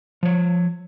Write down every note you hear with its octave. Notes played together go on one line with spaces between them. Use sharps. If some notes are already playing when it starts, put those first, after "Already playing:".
F3 C#5